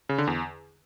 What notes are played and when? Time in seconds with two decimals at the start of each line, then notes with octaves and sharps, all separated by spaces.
0.09 C#3
0.18 D3
0.27 E2